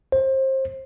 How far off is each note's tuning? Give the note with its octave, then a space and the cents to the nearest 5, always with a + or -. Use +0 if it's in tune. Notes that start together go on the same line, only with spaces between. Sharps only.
C5 +30